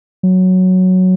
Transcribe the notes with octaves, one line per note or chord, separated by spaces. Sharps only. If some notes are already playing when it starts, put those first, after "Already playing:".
F#3